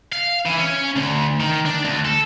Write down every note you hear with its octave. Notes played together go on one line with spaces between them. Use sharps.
F5
E3
C#4
D2
D#3
D4
D2
A4